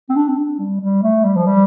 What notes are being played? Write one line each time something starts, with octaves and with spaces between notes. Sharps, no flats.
C4
D4
C4
D4
G3
G3
A3
G3
F3
G3